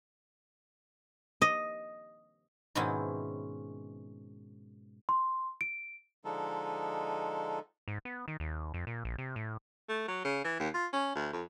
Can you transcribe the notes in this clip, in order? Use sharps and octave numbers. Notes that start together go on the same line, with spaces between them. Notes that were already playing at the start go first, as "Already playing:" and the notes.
D#5
G#2 B2 D#3 C4 C#4 E4
C6
D7
D3 F3 G#3 D#4 A4
G#2
B3
D#3
D#2
F2
A#2
A#1
C3
A2
A3
F#3
C#3
E3
D#2
F4
C#4
D2
F2